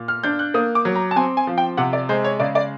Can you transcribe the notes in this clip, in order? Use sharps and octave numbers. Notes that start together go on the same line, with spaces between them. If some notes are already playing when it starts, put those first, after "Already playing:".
Already playing: A#2
F6
D4 G6
F#6
A#3 D#6
D6
F#3
A#5
A5
C4 G#5
G#5
F3
G5
C3 F#5
D5
G#3 C5
C#5
C#3 D5
D5